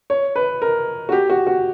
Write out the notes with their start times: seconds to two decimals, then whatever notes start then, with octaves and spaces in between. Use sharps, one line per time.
0.10 C#5
0.36 B4
0.62 A#4
1.09 F#4
1.12 G4
1.30 F#4
1.47 F#4